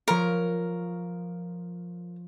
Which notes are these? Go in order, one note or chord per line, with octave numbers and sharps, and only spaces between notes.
F3 A#4 C#5